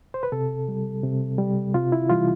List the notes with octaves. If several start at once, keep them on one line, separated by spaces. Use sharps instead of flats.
C5
B4
C3 A4
G3
C3
G3
C3 F4
E4
E3 G3 F4